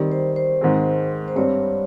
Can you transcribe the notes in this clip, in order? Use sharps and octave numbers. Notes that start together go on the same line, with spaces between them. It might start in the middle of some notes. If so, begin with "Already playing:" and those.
Already playing: D#3 G3 C4
C5
C5
G#2 D#3 G#3 C4
C5
G2 G3 C4 C#5